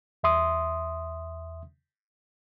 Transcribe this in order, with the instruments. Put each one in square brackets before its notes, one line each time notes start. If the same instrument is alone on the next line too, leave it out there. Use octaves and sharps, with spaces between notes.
[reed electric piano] E2 E5 C6 D#6